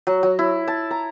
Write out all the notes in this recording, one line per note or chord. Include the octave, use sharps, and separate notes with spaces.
F#3
F#3
E4
A5
A#5